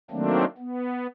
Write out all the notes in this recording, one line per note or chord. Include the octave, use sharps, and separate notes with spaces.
D#3 F#3 A3 A#3 C4 D4
B3